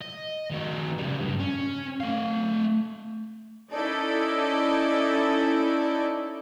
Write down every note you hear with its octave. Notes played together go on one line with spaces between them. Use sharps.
D#5
D#3 F#4
C#3 G3
G2
C#4
A3 F5
C#4 D#4 E4 A4 D5